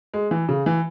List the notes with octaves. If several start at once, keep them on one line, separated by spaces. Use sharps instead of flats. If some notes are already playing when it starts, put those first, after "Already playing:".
G#3
E3
C#3
E3